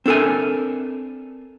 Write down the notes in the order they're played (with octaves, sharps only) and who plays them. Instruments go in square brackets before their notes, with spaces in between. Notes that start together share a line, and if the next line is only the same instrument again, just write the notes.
[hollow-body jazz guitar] C4 D4 A4 A#4 G#5